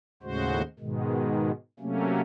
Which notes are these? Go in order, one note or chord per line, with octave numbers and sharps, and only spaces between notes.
D#2 A2 C#3 G#3 F#4 C5
G#2 B2 D#3 G#3
C3 F#3 A3 A#3 C#4